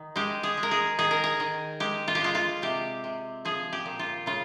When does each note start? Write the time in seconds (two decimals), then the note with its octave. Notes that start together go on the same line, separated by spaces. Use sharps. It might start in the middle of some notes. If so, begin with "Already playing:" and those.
Already playing: D#3
0.16 G#3 G4
0.43 G#4
0.57 G#3
0.63 A#4
0.71 G#4
0.98 D#3 G#4
1.11 A#4
1.24 G#4
1.40 D#3
1.80 G#3 G4
2.08 F4
2.15 G4
2.21 G#3 F4
2.35 F4
2.62 C3 G4
3.04 C3
3.45 F3 G#4
3.73 G4
3.86 A#2
3.99 F4
4.26 C#3 F4